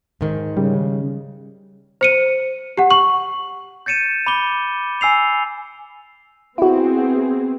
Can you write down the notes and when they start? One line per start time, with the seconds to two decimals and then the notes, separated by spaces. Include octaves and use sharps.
0.21 G#2 D#3
0.57 C#3 G3
2.01 C5 C#7 D#7
2.77 G4 F#5
2.90 C#6 F#7
3.86 G6 A6 C#7 D#7 E7
4.27 B5 D6 G7
5.01 G#5 E6 C7 F7
6.58 B3 C4 E4 F#4 G#4